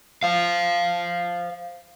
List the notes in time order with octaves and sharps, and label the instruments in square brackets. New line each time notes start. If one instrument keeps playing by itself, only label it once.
[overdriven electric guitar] C5 F5